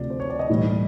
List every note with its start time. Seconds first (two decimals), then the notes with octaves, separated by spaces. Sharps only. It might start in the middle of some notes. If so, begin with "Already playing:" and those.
Already playing: D2 C3 F3 D5
0.10 C5
0.20 C#5
0.30 D5
0.39 D#5
0.49 A2 E3 G3